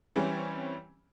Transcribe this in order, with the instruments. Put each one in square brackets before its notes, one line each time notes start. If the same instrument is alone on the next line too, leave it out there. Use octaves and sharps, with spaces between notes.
[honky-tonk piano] E3 G3 C4 C#4